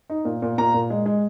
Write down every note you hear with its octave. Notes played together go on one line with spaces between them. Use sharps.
D#4
A#2
A#2
A#2 A#5
A#2
G#3
G#3